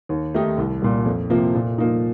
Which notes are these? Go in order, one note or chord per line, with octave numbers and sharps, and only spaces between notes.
D#2
D#3 A3 D#4 G4
C2
A#2 G3
F2
C3 F3 A#3
A#2
F3 A#3 D#4